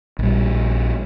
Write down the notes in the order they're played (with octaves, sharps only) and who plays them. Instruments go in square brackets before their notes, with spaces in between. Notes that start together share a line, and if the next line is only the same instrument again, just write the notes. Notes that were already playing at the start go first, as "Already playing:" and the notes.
[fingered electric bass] A#1 G3